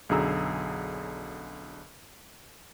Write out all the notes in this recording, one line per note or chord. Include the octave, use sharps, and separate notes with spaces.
B1 F#2 D3 G#4 A#5 E6